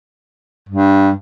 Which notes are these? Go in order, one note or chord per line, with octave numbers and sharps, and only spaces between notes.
G2